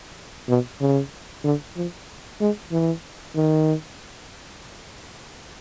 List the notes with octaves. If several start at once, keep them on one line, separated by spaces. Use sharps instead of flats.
B2
C#3
D3
F3
G#3
E3
D#3